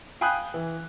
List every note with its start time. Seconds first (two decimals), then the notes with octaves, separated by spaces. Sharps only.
0.21 F5 G5 G#5 B5 D#6 F#6
0.54 E3